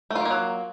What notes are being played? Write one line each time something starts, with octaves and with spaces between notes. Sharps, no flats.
D#3 F#3 A3 A#3 F4